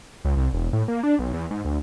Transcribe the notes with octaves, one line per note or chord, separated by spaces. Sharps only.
C#2
C2
E1
A2
A#3
D4
B1
E2
G#2
D2